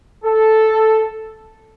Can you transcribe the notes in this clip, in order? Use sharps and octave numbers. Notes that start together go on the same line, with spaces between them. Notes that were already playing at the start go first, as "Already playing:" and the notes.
A4